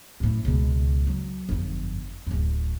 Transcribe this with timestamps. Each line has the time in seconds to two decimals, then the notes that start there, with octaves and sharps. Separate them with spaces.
0.20 F#2 A2
0.45 C#2 B2
1.07 F#3
1.49 G1 F2
2.27 D1 F#2